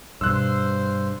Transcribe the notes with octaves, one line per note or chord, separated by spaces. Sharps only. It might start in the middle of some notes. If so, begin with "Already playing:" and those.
G2 B2 C5 E6 F#6